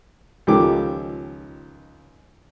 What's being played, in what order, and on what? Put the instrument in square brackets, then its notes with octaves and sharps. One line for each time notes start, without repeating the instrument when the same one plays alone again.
[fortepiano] C#2 D#3 F3 G4 A4 D6